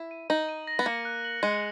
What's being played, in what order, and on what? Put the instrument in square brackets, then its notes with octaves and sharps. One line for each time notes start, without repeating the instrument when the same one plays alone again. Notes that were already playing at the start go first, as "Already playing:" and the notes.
Already playing: [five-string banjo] E4
[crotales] D#7
[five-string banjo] D#4 [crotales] F#7
[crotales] D#7
A#6
[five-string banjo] B3
[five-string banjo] A#3 [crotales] C#7
[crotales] F#6
F#7
[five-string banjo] G#3 [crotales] C#7